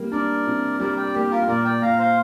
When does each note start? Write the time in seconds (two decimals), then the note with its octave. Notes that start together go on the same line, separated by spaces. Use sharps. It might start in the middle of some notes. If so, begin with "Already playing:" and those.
Already playing: C3 G3 A#3
0.12 D4 A#4 D5
0.47 C3
0.80 G3 A#4 D5
0.97 D5 G5
1.14 A#3 G4
1.31 F4 A#4
1.48 A#2 A#4 D5
1.65 D5 G5
1.82 A#2 F5 A#5
1.99 C5 F5